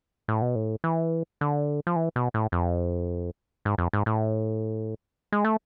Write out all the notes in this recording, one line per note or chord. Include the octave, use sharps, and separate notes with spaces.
A2
B2
A2
E3
D3
F3
E3
B2
A2
F2
G#2
F2
G#2
A2
G#3
A3